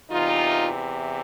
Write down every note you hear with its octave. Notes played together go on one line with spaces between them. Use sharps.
E2 C3 E3 D#4 F4